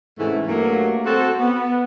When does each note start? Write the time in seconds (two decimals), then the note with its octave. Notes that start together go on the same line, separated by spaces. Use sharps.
0.19 G#2 C3 E3 A3 C#4 E4
0.47 G2 F#3 A3 A#3
1.06 C4 F#4 A4
1.39 B3